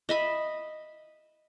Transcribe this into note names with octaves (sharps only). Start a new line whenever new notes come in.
D#5 E5 B5